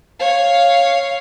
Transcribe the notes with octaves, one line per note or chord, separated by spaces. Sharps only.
C#5 F5